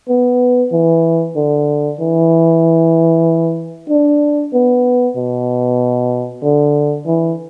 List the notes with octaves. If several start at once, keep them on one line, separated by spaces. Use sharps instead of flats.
B3
E3
D3
E3
D4
B3
B2
D3
E3